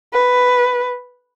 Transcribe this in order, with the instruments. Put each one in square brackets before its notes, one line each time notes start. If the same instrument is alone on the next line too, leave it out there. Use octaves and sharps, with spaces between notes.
[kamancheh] B4